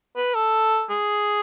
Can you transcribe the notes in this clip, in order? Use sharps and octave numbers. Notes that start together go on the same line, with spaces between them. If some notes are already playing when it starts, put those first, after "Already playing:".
B4
A4
G#4